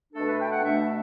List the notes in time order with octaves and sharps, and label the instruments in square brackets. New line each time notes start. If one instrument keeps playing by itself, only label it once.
[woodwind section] B2 A3 D4 A4
B4
G5
F#5
B2 A3 D4 E5